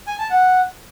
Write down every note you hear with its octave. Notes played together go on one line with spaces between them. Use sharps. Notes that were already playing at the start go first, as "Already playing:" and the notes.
G#5
A5
F#5